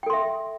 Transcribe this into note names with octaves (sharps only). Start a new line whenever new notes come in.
A4 E5 G5 C6